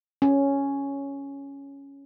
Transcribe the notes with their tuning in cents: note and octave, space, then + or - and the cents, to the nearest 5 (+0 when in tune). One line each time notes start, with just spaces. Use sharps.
C#4 +0